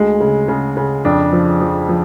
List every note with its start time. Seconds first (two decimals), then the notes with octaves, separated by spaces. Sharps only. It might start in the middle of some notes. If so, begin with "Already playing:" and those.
Already playing: D2 G#3
0.20 C#3
0.48 C#3
0.77 C#3
1.05 F2 D4
1.33 F3
1.61 F3
1.89 F3